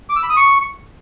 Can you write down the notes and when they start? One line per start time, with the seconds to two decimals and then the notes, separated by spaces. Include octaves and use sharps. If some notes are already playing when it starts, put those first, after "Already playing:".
0.09 D6
0.16 E6
0.23 B5
0.30 D#6
0.36 C#6